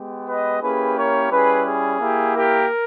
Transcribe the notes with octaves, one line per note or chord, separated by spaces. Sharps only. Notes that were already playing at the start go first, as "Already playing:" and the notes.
Already playing: G#3 B3 G4
B4 D#5
A#3 C#4 E4 G4 G#4 B4
A#4 C#5
G3 C#4 E4 G#4 B4
G#4
A#3 E4 G4
G4 A#4